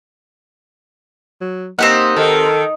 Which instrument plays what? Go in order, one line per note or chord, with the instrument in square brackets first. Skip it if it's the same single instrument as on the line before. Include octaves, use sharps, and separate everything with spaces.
[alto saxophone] F#3
[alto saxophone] A#3 [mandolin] C4 G4 F#5 [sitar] D#4
[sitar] D#3 [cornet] A4 [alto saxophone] A#4